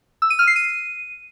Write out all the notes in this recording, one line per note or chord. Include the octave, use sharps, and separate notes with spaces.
E6
D#7
F6
C7
D#7